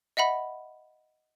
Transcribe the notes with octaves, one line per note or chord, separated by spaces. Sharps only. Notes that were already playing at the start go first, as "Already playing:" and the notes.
D#5 E5 F#5 B5